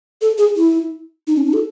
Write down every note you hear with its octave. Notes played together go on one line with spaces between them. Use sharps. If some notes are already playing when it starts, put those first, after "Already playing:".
A4
G#4
E4
D#4
C#4
D#4
A4